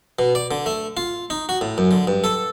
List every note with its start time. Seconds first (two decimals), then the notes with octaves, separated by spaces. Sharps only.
0.19 B2
0.35 D5
0.51 D3
0.66 A3
0.97 F4
1.30 D#4
1.49 F#4
1.61 A2
1.78 F#2
1.91 D3
2.07 G2
2.24 A4